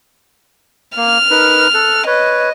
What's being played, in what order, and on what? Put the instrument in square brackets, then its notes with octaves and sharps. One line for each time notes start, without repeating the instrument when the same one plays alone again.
[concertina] A#3 [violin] F6
[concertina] D#4 A#4 B4
A4 F#6
[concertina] B4 C#5 [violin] D#5